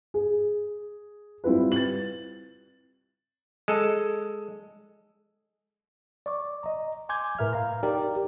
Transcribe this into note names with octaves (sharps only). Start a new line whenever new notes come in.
G#4
G3 C4 E4 F4 B4
A6 F#7
G#3 A4
D5 C#6 D6
D#5 A#5
G#5 C6 D6 G6 G#6
A2 A#4 B4 E5 F6
F5 A#5
D#4 G4 A#4 D5